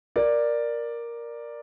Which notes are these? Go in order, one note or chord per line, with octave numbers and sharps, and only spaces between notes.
A#4 D5